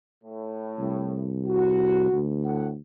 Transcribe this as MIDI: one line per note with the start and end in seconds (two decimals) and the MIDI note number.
0.24 1.29 45
0.79 2.10 36
1.46 2.22 66
2.12 2.80 38
2.45 2.68 45
2.45 2.68 78